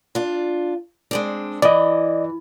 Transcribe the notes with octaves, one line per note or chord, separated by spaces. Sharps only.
D4 F4
G#3 C4 D4
E3 D5 D#5